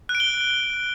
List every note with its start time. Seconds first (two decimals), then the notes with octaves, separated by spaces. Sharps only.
0.09 F#6
0.15 D7
0.20 G7